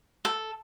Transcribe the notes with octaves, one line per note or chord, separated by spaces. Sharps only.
A4